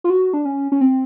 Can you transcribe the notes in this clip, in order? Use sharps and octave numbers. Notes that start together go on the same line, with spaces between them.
F4
F#4
D4
C#4
C#4
C4